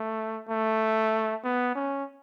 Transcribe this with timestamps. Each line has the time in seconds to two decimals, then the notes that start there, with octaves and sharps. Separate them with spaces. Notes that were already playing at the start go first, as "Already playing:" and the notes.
Already playing: A3
0.49 A3
1.44 B3
1.75 C#4